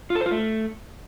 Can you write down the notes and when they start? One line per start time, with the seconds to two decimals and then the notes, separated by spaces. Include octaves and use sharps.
0.10 F4
0.15 A4
0.21 C5
0.26 F4
0.31 A3